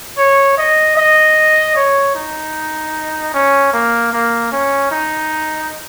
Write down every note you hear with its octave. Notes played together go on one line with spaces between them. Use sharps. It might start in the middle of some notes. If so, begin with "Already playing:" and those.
C#5
D#5
D#5
C#5
D#4
C#4
A#3
A#3
C#4
D#4